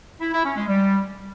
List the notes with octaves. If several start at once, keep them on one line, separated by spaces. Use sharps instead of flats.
E4
E4
C#4
G#3
G3